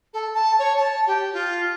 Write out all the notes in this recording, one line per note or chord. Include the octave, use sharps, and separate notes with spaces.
A4
A5
C#5
A5
G4
F4